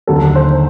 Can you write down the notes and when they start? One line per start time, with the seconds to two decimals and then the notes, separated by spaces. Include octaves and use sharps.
0.07 D#2 D3 F#3 A4
0.35 C5